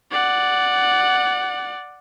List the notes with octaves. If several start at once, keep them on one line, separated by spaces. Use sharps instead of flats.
D5 F#5